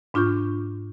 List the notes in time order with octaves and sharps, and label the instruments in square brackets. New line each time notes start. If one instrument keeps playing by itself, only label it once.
[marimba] G#2 D4 F4 C#6 G6